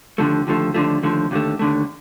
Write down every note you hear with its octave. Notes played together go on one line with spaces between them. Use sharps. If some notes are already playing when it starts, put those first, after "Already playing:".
D#2 D3 F3 A3
D#2 D3 F3 A3
D#2 D3 F3 A3
D#2 D3 F3 A3
D#2 D3 A3
D#2 D3 A3